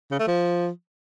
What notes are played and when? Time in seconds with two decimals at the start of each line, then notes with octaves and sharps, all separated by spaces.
0.11 C#3
0.19 A3
0.27 F3